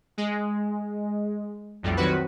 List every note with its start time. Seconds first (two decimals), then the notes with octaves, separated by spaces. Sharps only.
0.18 G#3
1.83 B1 F2 A2 G3
1.97 D#3 F#3 C4 F#4 B4